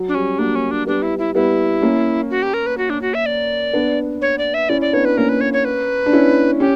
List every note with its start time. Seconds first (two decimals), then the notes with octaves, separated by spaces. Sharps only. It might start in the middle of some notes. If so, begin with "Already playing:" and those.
Already playing: F#3
0.08 D4
0.15 G3 C#4
0.39 F#3 A#3 D4
0.55 C#4
0.71 D4
0.87 G3 B3 D4
1.02 E4
1.19 E4
1.35 G3 B3 E4
1.82 A#3 C#4
2.30 F#4
2.43 G4
2.54 A#4
2.66 B4
2.78 F#4
2.90 D4
3.02 F#4
3.14 E5
3.26 D5
3.73 B3 D4
4.22 C#5
4.38 D5
4.54 E5
4.69 C#4 E4 D5
4.81 D5
4.93 B3 D4 C#5
5.05 B4
5.17 A#3 C#4 A#4
5.29 B4
5.41 C#5
5.53 C#5
5.65 B4
6.06 D4
6.13 C#4 E4
6.60 C#4 G4